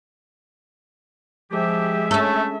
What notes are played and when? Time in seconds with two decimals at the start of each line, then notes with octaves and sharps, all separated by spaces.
1.51 F3 G#3 G4 E5
2.11 A3 C#4 A4 C#5